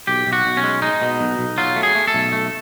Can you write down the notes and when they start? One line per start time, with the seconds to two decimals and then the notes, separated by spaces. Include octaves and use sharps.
0.07 B1 G4
0.27 B1
0.33 F#4
0.45 B1
0.57 C#4
0.63 G#3
0.82 G#3 D#4
1.02 B2
1.21 B1
1.39 B1
1.58 F#3 F4
1.76 A3
1.83 G#4
1.95 A3
2.08 A4
2.14 B1
2.32 A3